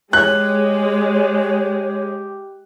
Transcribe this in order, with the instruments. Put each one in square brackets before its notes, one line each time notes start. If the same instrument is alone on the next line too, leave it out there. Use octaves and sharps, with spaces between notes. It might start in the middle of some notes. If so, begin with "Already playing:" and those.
[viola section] G#3 [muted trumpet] G4 [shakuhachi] C#5 [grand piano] F#6